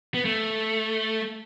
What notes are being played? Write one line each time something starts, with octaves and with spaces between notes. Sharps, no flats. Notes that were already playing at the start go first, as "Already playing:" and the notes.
B3
A3